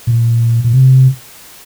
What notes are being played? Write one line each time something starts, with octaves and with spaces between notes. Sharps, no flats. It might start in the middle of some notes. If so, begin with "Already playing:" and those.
A#2
A#2
C3